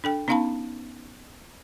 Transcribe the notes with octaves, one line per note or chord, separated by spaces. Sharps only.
D4 A4 G5
B3 C#4 D#4 F5 A5 B5